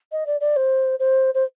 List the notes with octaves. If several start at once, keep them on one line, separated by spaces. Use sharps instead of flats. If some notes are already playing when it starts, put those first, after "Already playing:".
D#5
D5
D5
C5
C5
C5